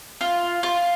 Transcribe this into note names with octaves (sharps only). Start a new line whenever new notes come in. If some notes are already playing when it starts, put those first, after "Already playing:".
F4
F4